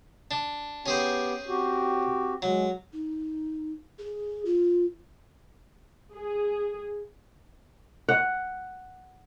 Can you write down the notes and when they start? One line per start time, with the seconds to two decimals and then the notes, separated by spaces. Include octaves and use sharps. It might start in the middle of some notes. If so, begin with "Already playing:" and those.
0.31 D4
0.86 B3 C#4 G4 G#4 C5 G5
1.48 C4 F#4 G4
2.42 F#3 G#3
2.93 D#4
3.99 G#4
4.45 F4
6.12 G#4
8.09 F#5